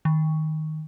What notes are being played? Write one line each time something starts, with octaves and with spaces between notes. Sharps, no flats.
D#3